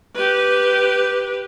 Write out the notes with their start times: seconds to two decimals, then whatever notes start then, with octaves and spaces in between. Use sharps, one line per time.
0.15 G4 B4